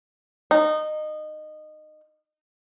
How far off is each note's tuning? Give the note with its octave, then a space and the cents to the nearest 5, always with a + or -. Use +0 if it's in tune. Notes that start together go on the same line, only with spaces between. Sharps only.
D#4 -20